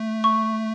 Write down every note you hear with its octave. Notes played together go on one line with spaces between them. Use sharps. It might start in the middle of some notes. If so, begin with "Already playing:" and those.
Already playing: A3
C#6